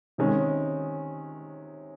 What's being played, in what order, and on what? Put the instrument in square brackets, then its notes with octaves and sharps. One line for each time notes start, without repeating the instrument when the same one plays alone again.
[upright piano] C3 D#3 G#3 C#4